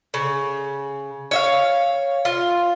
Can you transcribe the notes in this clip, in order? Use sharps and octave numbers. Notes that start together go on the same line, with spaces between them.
C#3
C#5 E5 F5
F4